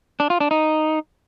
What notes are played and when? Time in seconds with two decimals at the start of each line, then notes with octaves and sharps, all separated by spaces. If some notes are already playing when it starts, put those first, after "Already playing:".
0.20 D4
0.30 F4
0.40 D4
0.51 D#4